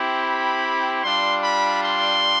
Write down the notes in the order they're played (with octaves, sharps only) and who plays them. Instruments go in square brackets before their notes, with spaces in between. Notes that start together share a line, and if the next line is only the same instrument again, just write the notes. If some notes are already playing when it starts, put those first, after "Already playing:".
Already playing: [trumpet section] C4 E4 G4
B5
G3 D4 F4 C6
B5
C6